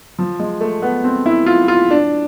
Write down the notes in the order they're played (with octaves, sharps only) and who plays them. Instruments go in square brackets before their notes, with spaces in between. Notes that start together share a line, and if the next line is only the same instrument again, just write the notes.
[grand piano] F3
G#3
A3
B3
C4
E4
F4
F4
D4